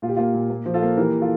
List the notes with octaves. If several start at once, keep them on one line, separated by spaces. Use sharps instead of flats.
A#2 F4
G4
A#3 F4
A#2
A#3
F3
F4 A4
A#3
E3 G4 A#4
F4 A4